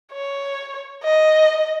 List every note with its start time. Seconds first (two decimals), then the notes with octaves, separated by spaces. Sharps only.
0.13 C#5
1.04 D#5